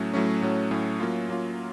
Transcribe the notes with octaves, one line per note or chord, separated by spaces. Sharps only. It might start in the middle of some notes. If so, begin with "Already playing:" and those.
Already playing: A2 F#3 A3 C#4
A2 F#3 A3 C#4
A2 F#3 A3 C#4
A2 F#3 A3 C#4
F#3 A#3 C#4 F4
F#3 A#3 C#4 F4